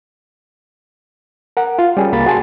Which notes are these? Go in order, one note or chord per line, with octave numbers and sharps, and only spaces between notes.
A#4 F#5
F4
G3 C#4 G#4
C2 A#3 B5 A6
F#4 G#4 G#5 A5 C6